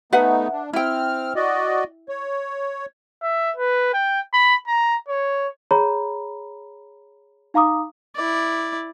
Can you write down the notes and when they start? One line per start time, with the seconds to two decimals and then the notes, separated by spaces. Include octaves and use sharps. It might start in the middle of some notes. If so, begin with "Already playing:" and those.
0.13 A3 B3 D#4 B4 E5 F#5
0.52 D4
0.73 C4 E4 G5 F6
1.36 F#4 D5 D#5
2.09 C#5
3.23 E5
3.57 B4
3.93 G5
4.33 B5
4.67 A#5
5.08 C#5
5.71 G#4 C#5 A#5 B5
7.54 D#4 F5 A#5 D6 D#6
8.15 E4 D5